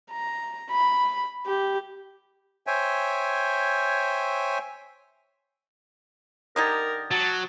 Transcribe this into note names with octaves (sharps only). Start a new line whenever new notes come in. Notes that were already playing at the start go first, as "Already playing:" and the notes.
A#5
B5
G4
C5 C#5 E5 G5 G#5
D3 D#4 G4 A#4 D#6 G#6 A6
F#3 A5